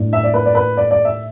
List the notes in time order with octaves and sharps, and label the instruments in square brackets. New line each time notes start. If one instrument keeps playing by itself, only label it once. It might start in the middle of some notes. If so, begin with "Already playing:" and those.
Already playing: [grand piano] A2 A3 D4
E5
D5
B4
D5
B4
D5
D5
E5